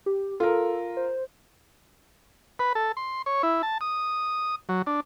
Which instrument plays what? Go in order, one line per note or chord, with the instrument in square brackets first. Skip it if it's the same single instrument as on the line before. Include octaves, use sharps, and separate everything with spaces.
[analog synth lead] G4
[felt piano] F4 A#4 [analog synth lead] A4
[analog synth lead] C5
[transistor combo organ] B4
A4
C6
C#5
E4
A5
D#6
F#3
D4